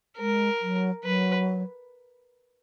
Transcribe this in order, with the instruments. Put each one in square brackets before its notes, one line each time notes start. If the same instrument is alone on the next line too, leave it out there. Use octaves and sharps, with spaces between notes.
[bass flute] G#3 [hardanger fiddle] A#4
[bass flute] F#3
[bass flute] F#3 [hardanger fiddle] B4